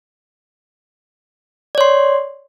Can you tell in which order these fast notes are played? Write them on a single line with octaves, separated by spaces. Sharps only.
D5 C#5 C6